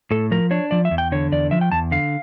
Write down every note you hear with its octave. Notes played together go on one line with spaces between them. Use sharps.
A2 A4
F3 A#4
D4 C#5
F3 D5
E5
E2
G5
D3 C#5
E2 D5
F3 E5
G5
E2 A5
D3 F5